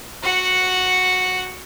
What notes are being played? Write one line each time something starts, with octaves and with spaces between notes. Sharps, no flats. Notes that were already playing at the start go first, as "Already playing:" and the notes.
F#4 F#5